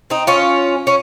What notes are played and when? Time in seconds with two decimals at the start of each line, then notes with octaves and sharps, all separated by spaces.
0.10 C4 D#4
0.27 C#4 F4
0.87 C#4